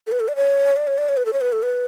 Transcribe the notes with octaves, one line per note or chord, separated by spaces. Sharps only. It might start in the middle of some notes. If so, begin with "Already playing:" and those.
A4
B4
A4
D5
C#5
D5
C#5
D5
C#5
B4
A4
C#5
B4
A4
B4